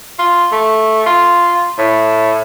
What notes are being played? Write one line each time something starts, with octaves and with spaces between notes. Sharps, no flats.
F4
A3
F4
A2